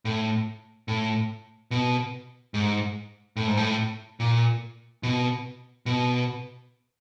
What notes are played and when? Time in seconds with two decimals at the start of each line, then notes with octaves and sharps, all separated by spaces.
0.05 A2
0.88 A2
1.71 B2
2.54 G#2
3.36 A2
3.47 G#2
3.57 A2
4.20 A#2
5.03 B2
5.86 B2